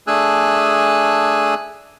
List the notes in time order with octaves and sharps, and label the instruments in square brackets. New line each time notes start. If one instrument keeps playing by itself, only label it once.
[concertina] A3 D4 G#4 G#5 E6 F#6